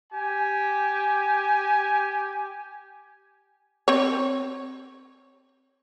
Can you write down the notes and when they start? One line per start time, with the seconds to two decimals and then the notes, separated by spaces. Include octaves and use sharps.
0.13 G4 G#5
3.88 C4 C#5